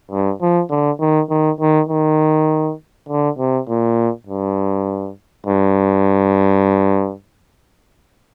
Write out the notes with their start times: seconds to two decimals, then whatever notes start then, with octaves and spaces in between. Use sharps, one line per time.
0.11 G2
0.42 F3
0.70 D3
1.00 D#3
1.30 D#3
1.60 D#3
1.89 D#3
3.09 D3
3.39 C3
3.68 A#2
4.27 G2
5.46 G2